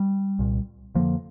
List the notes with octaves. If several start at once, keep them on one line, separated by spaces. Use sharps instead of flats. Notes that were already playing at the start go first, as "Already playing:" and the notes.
Already playing: G3
C2 A#2
F2 D3 F3 A#3